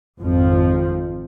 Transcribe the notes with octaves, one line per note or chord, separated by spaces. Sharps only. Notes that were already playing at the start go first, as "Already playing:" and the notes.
G#1 F2 F3